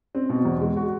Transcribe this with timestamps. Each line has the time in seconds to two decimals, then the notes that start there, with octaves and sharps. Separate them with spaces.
0.15 C4
0.29 B2
0.45 E2
0.61 G#3
0.76 F#4